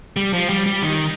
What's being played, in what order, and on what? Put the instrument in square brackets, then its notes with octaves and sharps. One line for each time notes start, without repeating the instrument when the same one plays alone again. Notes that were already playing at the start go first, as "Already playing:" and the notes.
[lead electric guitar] G3
F3
G3
G3
D#3